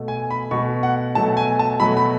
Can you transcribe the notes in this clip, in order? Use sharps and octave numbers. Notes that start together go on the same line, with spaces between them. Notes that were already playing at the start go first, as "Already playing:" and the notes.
Already playing: B2 A3
G#5
B5
B2 A3 C#6
F#5
B2 F#3 A3 A5
G#5
A5
B2 F#3 A3 B5
B5